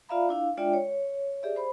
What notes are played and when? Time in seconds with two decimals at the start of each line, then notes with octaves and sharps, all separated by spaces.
0.09 F4 D5 E5 F5 A#5 B5
0.29 D4 E4 F5
0.57 G#3 D4 F4 D5 E5 G5
0.73 C#5
1.43 G4 G#4 D5 E5
1.56 C5 B5